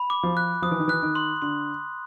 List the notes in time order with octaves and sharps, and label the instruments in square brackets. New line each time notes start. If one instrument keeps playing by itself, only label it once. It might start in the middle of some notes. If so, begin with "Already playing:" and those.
Already playing: [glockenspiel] B5
D6
[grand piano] F3
[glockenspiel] F#6
[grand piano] F3 [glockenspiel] D#6
[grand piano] E3
D#3
[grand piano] E3 [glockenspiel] F#6
[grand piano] D#3
[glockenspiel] C6
[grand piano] D3 [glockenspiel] C6